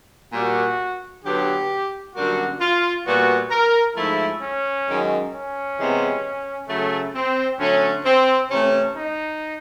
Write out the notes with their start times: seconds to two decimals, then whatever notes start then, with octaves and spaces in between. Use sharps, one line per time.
0.33 A#2 G3 A#3 F#4
1.24 D3 F#3 B3 G4
2.15 F#2 D3 G3 A#3 F#4
2.60 F4
3.06 A#2 G3 B3 F#4
3.51 A#4
3.96 G#2 F3 A3 E4
4.41 C#4
4.88 F#2 D#3 G#3
5.33 C#4
5.78 C3 E3 G#3 B3
6.68 C#3 F#3 A3
7.15 C4
7.59 D3 F#3 A3 C#4
8.05 C4
8.50 C3 E3 A3 C#4
8.96 D#4